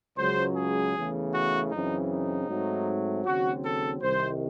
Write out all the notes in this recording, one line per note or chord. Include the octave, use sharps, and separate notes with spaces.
C#2 C#3 F#3 C5
G#4
E2 C#3 E3 A3
F#4
F#2 C#3 E3 C4 D#4
D#4
G#2 F#3 A3 C4
D#2 C#3 F#3 C4 F#4
A4
C2 C3 D#3 C5